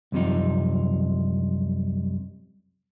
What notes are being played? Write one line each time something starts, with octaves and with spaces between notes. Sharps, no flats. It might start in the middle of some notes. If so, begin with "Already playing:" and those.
C2 F#2 C3 F3 D#4